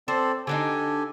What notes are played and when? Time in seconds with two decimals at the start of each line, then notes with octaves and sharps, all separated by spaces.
0.08 C4 A4 C5 D5
0.47 D3 D4 D#4 G4 A4 G#5